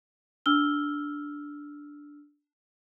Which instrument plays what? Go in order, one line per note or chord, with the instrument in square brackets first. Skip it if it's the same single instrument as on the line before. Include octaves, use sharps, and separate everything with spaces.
[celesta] D4 E6 F6 G7